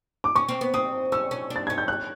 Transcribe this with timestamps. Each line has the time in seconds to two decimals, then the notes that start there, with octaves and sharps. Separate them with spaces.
0.24 D6
0.36 C#4 C#6
0.49 C4
0.61 B3
0.74 C4 D#6
1.12 C#4 E6
1.31 C#4
1.50 D4
1.56 A6
1.67 C#4 G#6
1.78 G6
1.88 F#6